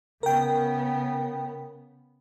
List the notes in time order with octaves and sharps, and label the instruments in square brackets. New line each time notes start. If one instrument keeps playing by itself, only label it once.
[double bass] C#3 B3 [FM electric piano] A#4 G5